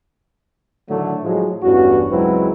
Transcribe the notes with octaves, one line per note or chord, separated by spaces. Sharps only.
A2 D3 D#3 F#3 A3
A2 F3 F#3 G#3
A1 E2 G2 C#4 F#4
C#2 F#3 G#3 C4 E4 B4